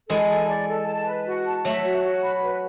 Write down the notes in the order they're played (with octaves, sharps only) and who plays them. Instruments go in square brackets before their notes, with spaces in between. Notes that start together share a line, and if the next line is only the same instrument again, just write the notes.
[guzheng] E3 G#3 [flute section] A4
[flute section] A4
D5
A4
A5
B4
F#4
A5
[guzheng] F#3 A3 [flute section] E5
[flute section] F#4
F#4
B5
B4